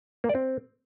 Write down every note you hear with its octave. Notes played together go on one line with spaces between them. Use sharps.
A#3
D5
C4